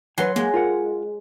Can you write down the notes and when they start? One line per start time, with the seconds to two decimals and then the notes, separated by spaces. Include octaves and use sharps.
0.18 F#3 B4 F#5 G#5 C6
0.36 G#3 A#3
0.54 F4 A#4 F#5